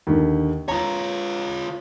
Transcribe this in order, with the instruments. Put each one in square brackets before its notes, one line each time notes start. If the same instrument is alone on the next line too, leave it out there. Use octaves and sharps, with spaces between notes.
[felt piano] D#2 D3
[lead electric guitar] F4 C#5 [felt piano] A#5